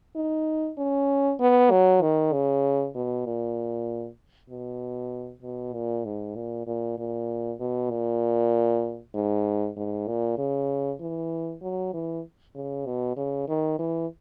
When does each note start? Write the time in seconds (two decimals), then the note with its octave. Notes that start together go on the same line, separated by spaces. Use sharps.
0.16 D#4
0.78 C#4
1.40 B3
1.71 F#3
2.02 D#3
2.33 C#3
2.95 B2
3.26 A#2
4.50 B2
5.42 B2
5.74 A#2
6.05 G#2
6.35 A#2
6.67 A#2
6.98 A#2
7.59 B2
7.91 A#2
9.15 G#2
9.77 G#2
10.08 A#2
10.38 C#3
11.00 E3
11.62 F#3
11.93 E3
12.55 C#3
12.86 B2
13.17 C#3
13.48 D#3
13.79 E3